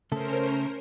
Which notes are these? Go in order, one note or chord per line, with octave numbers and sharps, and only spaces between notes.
C#3 A3 C#4 A4 A#4 C5